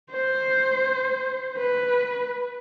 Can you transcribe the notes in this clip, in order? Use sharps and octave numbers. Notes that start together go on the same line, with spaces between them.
C5
B4